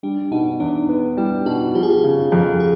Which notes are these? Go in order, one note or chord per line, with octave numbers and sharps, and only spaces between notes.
G3 D4
B2 D#4
E2 D4
B3
G3 E4
B2 F#4
F3 G4
G#4
G4
C#3
F2
G#4